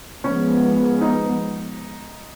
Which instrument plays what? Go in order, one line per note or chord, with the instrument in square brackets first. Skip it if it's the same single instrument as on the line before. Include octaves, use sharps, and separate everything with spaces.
[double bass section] F3 G#3 B3 [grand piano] C#4
[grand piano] D#4